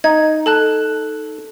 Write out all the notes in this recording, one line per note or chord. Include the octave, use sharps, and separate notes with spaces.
D#4 G#6
A4 A5 F#6